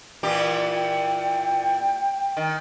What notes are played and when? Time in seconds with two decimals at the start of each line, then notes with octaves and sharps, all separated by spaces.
0.23 A#2 E3 G4
0.75 G5
2.37 D#3